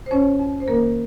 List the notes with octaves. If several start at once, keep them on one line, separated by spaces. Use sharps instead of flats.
C5
F2 C#4 C#5
F2
C5
D#3 A#3 A#4